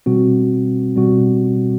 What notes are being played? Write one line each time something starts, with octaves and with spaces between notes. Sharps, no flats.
B2 G3 C4 F#4
B2 G3 C4 F#4